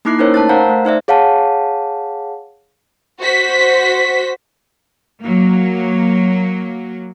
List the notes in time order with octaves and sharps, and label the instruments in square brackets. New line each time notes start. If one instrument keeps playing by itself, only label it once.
[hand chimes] A#3 D#4 E4 D6 F#6 C7
C#4 D#4 A#4 C5 C#5
A3 A5 F#6 A6
A#4 C5 F5 F#5 A#5 G6
A3
D#4 C5 D5 E5
G#4 C#5 F5 F#5 A5
[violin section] F#4 C5 B6
[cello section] F#3 A#3